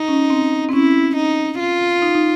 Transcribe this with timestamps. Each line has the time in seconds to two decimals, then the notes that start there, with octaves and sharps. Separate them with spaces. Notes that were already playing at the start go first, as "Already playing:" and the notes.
Already playing: D#4
0.08 C#4
0.30 C4
0.69 C4
0.73 C#4 E4
1.16 D#4
1.59 F4
2.02 D#4
2.15 D#4